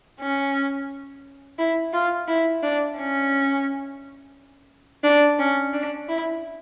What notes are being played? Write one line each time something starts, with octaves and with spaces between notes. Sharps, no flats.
C#4
E4
F4
E4
D4
C#4
D4
C#4
D4
E4